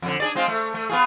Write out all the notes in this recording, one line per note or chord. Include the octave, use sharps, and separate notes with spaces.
F2 D3
D4 G#4 D5
G#3 C4 F4
A3
A3
B3 F4 G#4